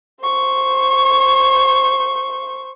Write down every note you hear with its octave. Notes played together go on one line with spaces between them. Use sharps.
C5 C#6